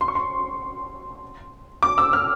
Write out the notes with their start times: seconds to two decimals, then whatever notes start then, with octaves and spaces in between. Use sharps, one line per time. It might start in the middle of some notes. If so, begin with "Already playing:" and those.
0.01 C6
0.08 C#6
0.15 C6
1.83 D6
1.98 E6
2.13 F6